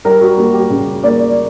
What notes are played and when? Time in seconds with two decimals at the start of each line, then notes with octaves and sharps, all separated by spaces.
0.05 G3 A#4
0.21 F#4
0.38 A#3 F#4
0.54 G4
0.70 C#3
1.03 A#3 D5